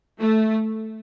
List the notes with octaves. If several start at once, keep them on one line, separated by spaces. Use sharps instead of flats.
A3